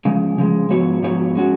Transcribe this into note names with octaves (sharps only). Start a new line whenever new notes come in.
C#3 F3 G#3
C#3 F3 G#3
G#2 F3 B3 F#4 C#5
G#2 F3 B3 F#4 C#5
G#3 C#4 F#4